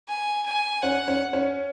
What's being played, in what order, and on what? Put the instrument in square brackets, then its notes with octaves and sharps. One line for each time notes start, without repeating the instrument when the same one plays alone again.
[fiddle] G#5
G#5
[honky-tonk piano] C#4 [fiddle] F#5
[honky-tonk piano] C#4
C#4